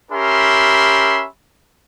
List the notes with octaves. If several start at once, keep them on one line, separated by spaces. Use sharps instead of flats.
C#4 G4 A#4 E5 B5 C6